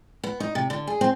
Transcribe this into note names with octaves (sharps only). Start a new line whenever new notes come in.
B3
D#4
C3
D3
G#4
C4